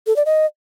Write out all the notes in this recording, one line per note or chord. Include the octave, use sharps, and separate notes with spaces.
A4
D5
D#5